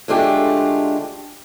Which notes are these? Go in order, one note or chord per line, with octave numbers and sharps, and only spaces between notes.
D3 G#3 A3 D4 F4 G4